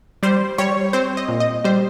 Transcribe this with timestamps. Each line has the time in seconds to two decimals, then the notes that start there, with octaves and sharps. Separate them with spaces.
0.23 G3 C5
0.58 G3 C#5
0.93 C4 C5
1.17 D#5
1.29 A#2
1.40 D#5
1.64 G3 C5